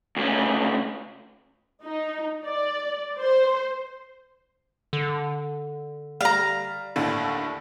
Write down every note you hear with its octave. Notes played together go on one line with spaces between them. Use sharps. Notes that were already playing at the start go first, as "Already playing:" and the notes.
D2 C#3
D#4
D5
C5
D3
G3 F5 A#5
D#2 A2 D3